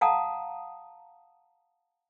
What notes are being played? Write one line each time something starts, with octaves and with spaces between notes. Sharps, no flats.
F5 F#5 A5 A#5 D#6